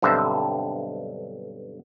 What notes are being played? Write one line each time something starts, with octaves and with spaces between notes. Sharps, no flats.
B1 G2 D3 C4 C5 E5